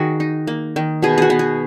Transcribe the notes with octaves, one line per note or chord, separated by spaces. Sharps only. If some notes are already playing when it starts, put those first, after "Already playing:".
Already playing: D#3 F#4 G#4
D#4
A#3
D#3
B2 G#4
F#4 G#4
B3
G#4